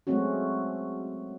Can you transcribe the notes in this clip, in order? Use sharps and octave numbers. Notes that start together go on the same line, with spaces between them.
F#3 G#3 A3 C4 C#4 F#4